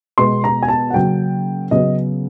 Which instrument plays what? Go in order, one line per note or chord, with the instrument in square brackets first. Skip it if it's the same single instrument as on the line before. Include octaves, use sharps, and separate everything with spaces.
[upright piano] B2 G#3 B3 C6
A#5
G#5
A5
F#5
C#3 F#3 A#3 G5
C#3 F#3 B3 D#5